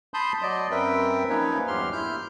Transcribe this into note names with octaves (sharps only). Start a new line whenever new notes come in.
A5 B5 C6 D#6 G6
F#3 D5 D#5
F#2 C4 A#4 B4 E5 G5
F3 A#3 C#4 D#4 B4 C#5
E2 G2 F#3 G4 C6 F6
E4 F6 G6